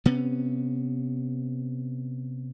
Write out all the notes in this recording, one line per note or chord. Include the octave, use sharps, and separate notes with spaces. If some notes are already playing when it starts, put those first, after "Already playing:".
C3 B3 C#4